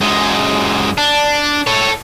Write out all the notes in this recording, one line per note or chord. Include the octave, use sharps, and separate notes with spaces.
F#2 G#3
D4
A4 C#5